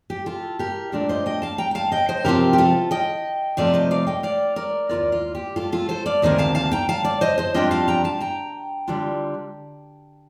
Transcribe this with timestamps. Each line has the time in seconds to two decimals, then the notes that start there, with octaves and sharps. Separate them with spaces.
0.10 G4
0.26 F4 A4
0.59 G4 A#4
0.92 A#2 A3 D4 F4 A#4 D5
1.09 C5 D#5
1.26 D#5 G5
1.42 F5 A5
1.58 G5 A#5
1.71 G5
1.75 F5 A5
1.92 D#5 G5
2.09 C5 D#5
2.25 C3 F3 C4 F4 G4 A#4
2.53 G4
2.58 F4 A4
2.91 D#5 G5
3.57 C3 F3 A3 D#4 D5 F5
3.74 C5 D#5
3.91 D5 F5
4.07 D#5 G5
4.23 D5 F5
4.56 A#4 D5
4.89 D#2 D#3 A#3 F4 A#4 D5
5.12 F4
5.35 G4
5.56 F4 A4
5.72 F4 A4
5.89 A4 C5
6.06 D5 F5
6.22 D2 C3 D#3 A#3 C5 D#5
6.38 F5 A5
6.55 F5 A5
6.71 G5 A#5
6.89 F5 A5
7.05 D5 F5
7.21 C5 D#5
7.38 C5 D#5
7.54 F2 D#3 G3 D4 F4 D#5 G5
7.71 F5 A5
7.88 G5 A#5
8.04 F5 A5
8.20 G5 A#5
8.88 D3 G3 D4 F4